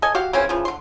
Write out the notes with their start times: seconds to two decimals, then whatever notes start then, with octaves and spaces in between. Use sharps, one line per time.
0.02 A4 D#5 G#5
0.15 F#4 G4 F5
0.33 C#3 E3 C4 C#4
0.49 C#3 E3 F3
0.65 D3 C6